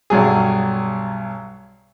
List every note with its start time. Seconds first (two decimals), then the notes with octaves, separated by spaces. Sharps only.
0.10 B1 G2 F#3 G#4